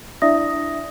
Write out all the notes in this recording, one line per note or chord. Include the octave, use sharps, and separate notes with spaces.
D4 E4 D5 E5 D#6 A#6